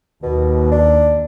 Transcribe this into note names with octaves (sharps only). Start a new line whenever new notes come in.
D#2 B2
D4